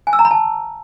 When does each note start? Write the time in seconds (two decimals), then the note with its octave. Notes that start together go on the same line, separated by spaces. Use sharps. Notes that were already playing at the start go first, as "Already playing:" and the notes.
0.07 G#5
0.13 E6
0.19 A#5
0.25 B5
0.31 A5